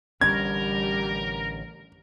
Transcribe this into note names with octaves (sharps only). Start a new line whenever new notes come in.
A1 D3 G3 C#4 A#4 G#6